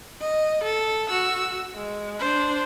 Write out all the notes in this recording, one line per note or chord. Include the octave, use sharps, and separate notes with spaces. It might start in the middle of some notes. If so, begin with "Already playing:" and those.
D#5
A4
F#4 E6
G#3
D4 C5